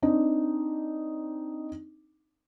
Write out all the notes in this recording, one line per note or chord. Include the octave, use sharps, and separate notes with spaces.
C4 D4 D#4